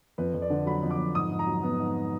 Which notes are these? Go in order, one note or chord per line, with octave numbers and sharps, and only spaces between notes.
F2 B4
F2
D5
D3
F#3 B5
F2
D6
F2
G#2 D#6
G#2
A#5
F#3
B3
G#2